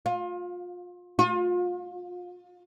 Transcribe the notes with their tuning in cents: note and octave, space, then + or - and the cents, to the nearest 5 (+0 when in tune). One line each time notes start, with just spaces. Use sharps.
F4 +30
F4 +35